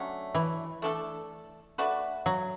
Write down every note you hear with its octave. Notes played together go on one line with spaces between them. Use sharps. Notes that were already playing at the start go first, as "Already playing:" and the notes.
Already playing: D3 F#3 A3 C#4
E3
A3 D4 A4
A3 D4 F#4 B4
F#3